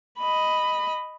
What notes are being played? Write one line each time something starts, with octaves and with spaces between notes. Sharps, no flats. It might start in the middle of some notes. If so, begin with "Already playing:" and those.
D#5 B5